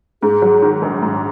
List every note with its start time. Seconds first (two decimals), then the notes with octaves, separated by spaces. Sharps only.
0.22 G#2 G#4
0.42 F#3
0.62 D#3
0.82 A#1
1.02 G#2